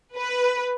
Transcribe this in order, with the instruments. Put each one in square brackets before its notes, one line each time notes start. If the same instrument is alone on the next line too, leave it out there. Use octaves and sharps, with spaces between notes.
[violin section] B4